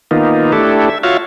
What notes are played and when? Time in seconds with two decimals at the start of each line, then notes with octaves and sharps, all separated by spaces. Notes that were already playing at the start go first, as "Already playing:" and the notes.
0.11 D#3 A#3 B3 D#4 F4
0.52 A3 D4 E4 G4 A4
0.90 E5
1.03 F4 F#4 C#5 E5 F5